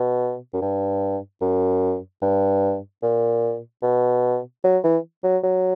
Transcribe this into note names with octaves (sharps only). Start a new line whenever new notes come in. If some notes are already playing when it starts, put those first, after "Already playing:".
Already playing: B2
F#2
G2
F#2
G2
A#2
B2
F#3
E3
F#3
F#3